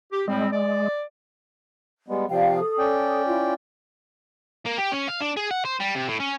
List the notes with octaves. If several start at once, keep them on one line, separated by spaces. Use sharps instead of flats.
G4
A2 G3 G#3 C4
D5
G3 G#3 B3
C3 F3 D5 F5 G5
A4 D#6
C#4 D5 G5
E4 F4
A#3
G4
C#4
F5
D4
G#4
F#5
C5
G3
C3
A2
C#4